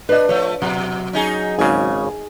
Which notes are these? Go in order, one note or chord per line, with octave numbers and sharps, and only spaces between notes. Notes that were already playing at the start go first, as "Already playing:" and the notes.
D4 B4 D#5
F3 A3 C#5
B2 F#3
C#4 D#4 G#4
G#1 C#3 G#4